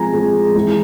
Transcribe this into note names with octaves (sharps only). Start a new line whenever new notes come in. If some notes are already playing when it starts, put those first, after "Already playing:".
Already playing: F3 G#3 C4 G#5 A#5
F3 G#3 C4
E3 G#3 C4